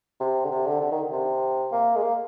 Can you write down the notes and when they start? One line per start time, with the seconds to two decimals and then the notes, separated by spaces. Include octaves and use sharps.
0.20 C3
0.45 D3
0.51 C3
0.66 D3
0.81 D3
0.91 D#3
1.11 C3
1.72 A#3
1.96 G#3
2.02 A#3